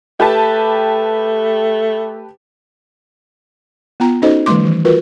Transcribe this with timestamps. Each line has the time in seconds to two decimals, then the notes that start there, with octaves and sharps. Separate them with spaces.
0.20 A3 G4 B4 A5
4.00 B3 F4 G5 A#5
4.22 C#4 D#4 F#4 A4 C5 D#5
4.46 D#3 F3 G3 A3 C6 D6
4.65 E3
4.85 F4 F#4 A#4 B4